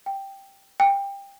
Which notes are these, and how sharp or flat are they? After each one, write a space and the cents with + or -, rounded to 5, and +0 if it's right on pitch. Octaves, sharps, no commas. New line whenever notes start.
G5 +0
G5 +20